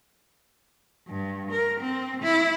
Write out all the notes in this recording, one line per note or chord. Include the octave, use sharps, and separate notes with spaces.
G2
A#4
C4
E4